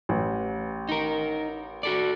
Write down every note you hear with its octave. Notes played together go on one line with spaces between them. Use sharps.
A1
D#4 A#4
F#4 A4 D5